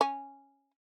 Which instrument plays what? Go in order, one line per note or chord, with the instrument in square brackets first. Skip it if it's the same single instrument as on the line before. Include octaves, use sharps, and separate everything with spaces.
[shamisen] C#4